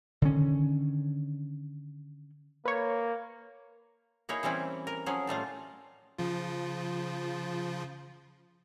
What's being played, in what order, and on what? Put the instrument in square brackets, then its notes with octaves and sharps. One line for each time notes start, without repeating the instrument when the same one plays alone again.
[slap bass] D3 D#3 C#4
[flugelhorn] A#3 [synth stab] B4 C#5
[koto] A#3 D#4 E4 G#4 C#5
E3 G3 C4 C#4 E4
A#4
F3 F#3 C#4 G#4
A2 G3 A3 F4
[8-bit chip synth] C#3 F3 F4